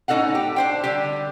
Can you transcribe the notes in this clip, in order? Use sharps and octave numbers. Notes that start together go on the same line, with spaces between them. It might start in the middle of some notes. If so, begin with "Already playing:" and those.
A2 C#4 D#4 A4 F5 F#5
G4
D4 C5 G5
D3 G3 G4